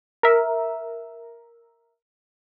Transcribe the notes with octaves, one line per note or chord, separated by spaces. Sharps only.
A#4 E5